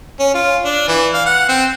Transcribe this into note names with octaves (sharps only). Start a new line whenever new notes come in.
C#4
F4
D4
E3
F5
F#5
C4